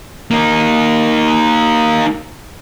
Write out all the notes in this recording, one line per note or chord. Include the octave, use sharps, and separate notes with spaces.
A#3 D#4